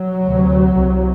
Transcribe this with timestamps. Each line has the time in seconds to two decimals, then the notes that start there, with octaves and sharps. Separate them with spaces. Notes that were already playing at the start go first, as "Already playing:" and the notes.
Already playing: F#3
0.24 D2 C3
0.76 C2 C3